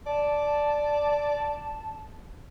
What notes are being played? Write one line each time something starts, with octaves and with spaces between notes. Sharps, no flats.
D5 A5